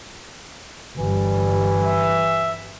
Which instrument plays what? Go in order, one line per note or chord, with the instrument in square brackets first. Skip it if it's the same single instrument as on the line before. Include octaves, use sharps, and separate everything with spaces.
[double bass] G1 G3 [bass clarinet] E3
[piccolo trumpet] E5